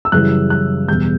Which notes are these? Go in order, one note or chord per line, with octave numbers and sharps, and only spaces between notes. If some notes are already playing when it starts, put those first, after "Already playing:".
E6
F#2 C#3 E3 G3 F#6
F#6
E2 B2 G3 G6